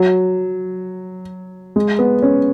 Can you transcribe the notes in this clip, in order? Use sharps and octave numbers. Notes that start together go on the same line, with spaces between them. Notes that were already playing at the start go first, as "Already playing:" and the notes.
Already playing: F#3
G#3
B3
C#4